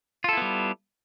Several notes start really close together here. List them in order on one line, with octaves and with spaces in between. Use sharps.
F4 A4 E4 B3 G3